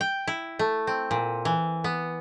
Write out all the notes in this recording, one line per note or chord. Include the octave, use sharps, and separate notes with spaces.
G5
E4
A3
C4
A#2
E3
B3